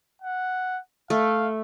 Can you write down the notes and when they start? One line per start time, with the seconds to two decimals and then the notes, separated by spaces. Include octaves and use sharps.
0.22 F#5
1.10 A3 F5